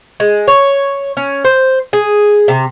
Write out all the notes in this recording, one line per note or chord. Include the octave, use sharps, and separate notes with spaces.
G#3
C#5
C#4
C5
G#4
C3